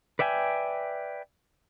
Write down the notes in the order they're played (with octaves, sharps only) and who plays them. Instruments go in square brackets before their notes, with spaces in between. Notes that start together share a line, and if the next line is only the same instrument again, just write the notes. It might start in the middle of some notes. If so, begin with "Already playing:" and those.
[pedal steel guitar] B4 D5 E5 G5 G#5